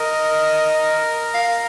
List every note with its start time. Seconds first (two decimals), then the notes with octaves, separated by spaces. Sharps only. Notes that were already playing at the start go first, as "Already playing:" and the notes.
Already playing: A#4 D#5
1.34 F5